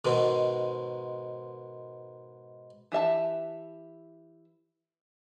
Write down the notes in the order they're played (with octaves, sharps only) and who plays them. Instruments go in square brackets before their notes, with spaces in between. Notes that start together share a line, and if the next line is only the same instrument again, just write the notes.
[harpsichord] G#2 B2 D#3 G#3
[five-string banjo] E3 G4 E5 A5